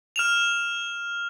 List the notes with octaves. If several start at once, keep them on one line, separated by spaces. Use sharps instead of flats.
F6 E7 F7